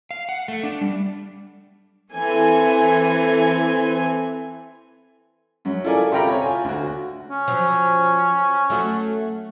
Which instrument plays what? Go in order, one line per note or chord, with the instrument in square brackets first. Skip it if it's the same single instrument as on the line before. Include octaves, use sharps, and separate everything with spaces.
[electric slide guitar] F5
F#5
A3
D4
G3
[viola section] E3 C4 A4 G#5
[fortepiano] F#2 F#3
E4 F4 A4 A#4 D5 G#5
C3 F4 A4 G5 A#5 B5
C#5
F4 G#5
D2 F#4
[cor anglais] C#4
[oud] F3 F#3
F#3 A3 F#4